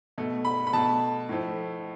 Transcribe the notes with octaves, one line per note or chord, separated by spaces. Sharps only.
B2 A3
B5
B5
B2 A3 A5
A2 F3 A3